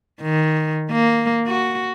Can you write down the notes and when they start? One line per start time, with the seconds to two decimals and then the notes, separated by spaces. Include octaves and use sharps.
0.22 D#3
0.91 A#3
1.47 F#4